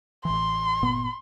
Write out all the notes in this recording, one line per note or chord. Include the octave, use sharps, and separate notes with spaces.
A1 E3 C6
G1 A#2 B3